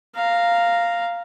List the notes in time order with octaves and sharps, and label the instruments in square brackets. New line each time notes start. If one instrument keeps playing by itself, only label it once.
[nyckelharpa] F5 A#5